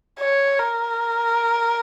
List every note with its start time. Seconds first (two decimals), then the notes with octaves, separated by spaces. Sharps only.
0.19 C#5
0.60 A#4